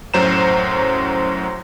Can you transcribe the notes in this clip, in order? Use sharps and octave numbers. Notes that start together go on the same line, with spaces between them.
F#2 A2 F#3 C5 A#5 E7